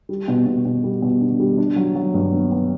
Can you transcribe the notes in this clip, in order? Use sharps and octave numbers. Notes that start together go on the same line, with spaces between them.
G3
B2
B2
B2
G3
B2
D4
G3
D4
F#3
F#3
G2
B3
B3